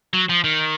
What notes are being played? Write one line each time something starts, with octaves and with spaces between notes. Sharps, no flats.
F#3
F3
D#3